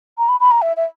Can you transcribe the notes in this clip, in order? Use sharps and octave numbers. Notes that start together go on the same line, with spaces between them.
A#5
B5
B5
A#5
E5
E5